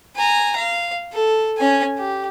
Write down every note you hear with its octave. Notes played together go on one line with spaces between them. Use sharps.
G#5 A#5
F5
A4
C#4 G#5
G4